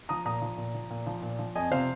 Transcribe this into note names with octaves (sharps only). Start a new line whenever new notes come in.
F3 A#5 D#6
A#2 A#5 D#6
F3
A#2
F3
A#2
F3
A#2
F3
F2 D#5 G#5
C3 F3 C5 F5